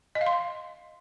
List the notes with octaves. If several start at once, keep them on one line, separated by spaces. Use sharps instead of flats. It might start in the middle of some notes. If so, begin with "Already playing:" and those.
D#5
F5
C6